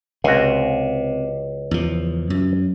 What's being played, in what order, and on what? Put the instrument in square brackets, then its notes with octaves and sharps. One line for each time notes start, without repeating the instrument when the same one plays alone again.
[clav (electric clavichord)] C#2 F#4 [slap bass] C3
[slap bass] E2 F3
F#2